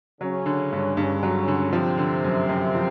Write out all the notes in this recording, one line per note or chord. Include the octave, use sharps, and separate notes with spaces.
C#3 F#3 C#4
D3
G2
G2 C#3 C#4
F#3
D3
C3 F3 C4
D3
F#2
F#2
F3